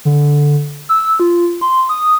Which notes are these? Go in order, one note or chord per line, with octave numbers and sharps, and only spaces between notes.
D3
E6
F4
C6
D#6